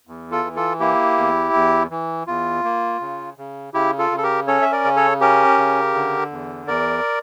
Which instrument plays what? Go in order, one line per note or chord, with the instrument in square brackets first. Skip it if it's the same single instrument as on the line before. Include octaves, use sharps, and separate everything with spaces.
[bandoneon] E2
F4 A4
E3
F4 A4
A#3 E4 G4
E2
E2
E3
E2 F4
A#3
C#3
C#3
C#3 E4 G4
F4 A4
C#3
A4
G4 A#4
C#4 A4 C#5
E5
A#4 D5
C#3
A4 C#5
C#4 G4 A#4
C#3
D3
E2
E2 A#4 D5